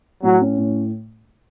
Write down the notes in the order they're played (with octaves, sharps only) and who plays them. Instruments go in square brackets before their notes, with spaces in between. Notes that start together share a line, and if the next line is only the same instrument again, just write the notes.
[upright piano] A2 [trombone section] F#3
[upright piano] C#4
A2